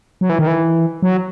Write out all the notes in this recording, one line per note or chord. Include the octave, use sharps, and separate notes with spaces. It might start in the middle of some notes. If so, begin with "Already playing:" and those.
F#3
E3
D#3
E3
F#3